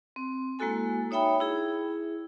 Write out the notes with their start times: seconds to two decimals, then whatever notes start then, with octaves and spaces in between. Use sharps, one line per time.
0.16 C4
0.59 G#3 A#3 E4 F#4 A4 G#5
1.11 D#4 C#5 E5 G5 B5
1.40 E4 G#4